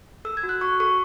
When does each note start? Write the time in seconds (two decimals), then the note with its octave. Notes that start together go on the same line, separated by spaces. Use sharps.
0.25 A4 E6
0.37 G#6
0.43 F#4
0.49 F#6
0.61 F#4 C#6
0.80 A4 C#6